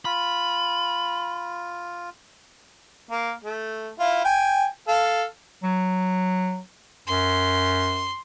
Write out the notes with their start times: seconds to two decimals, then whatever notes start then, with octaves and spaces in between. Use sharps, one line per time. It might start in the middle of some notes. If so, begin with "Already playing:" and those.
0.05 F4 B5
3.11 A#3
3.44 A3
4.00 E4 F4
4.24 G5 G#5
4.88 A4 F5
5.63 F#3
7.08 F#2 C6